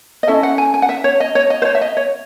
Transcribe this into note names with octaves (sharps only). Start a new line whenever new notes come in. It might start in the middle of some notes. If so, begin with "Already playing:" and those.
D#5
C#4 E4 A4 E5
F#5
G#5
G#5
F#5
E5
C#5
D#5
C#5
D#5
C5
C#5
E5
D#5
C#5